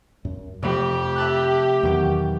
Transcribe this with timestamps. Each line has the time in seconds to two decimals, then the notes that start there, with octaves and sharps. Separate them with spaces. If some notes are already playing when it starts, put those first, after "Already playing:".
0.25 F#2
0.63 F2 C3 A3 G4 B5
1.16 E5 A5 F#6
1.83 E2 B2 D#3 F#3 G5